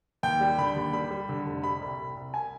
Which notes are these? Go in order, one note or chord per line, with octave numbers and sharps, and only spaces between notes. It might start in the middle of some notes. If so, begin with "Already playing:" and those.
D#2 G5
G3
D3 B5
D#2
G3 B5
G3
D3
F1
G3 B5
C2
C2
C2
G#5